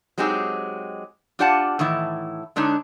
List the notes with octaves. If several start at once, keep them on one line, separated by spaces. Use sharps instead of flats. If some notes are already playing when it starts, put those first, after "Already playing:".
F#3 G#3 C4 D#4 G4 G#4
D4 F4 G4 D5 F#5 A5
A2 D#3 E3 E4
D3 G#3 D4 D#4 C#5